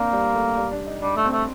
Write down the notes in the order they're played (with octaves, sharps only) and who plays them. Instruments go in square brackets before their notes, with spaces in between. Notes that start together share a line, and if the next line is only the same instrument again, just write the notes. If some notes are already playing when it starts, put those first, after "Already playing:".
Already playing: [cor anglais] A#3 [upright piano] C4 D4
[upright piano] G3
A3
G3
D4
D#4
[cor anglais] G3 [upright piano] D4
[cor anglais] A3
[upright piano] C4
[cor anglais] A3